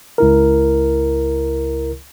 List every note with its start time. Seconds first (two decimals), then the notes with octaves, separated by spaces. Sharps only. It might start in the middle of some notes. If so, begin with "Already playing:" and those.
0.18 C#2 E4 A#4